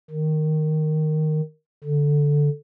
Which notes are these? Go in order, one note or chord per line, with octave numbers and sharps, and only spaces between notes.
D#3
D3